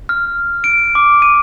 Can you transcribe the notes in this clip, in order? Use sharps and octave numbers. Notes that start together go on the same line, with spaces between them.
F6
D7
D6
D#7